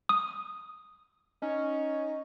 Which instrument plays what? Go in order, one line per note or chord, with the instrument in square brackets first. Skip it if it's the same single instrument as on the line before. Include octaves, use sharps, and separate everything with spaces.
[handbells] D#6
[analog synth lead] C#4 [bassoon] D#4